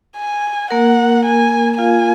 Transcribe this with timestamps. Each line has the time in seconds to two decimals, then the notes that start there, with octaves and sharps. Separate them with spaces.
0.17 G#5
0.71 A#3 A#4 F#5
1.25 G#5
1.78 F4 F5 G#5